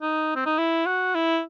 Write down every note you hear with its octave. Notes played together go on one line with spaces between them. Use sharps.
D#4
C4
D#4
E4
F#4
E4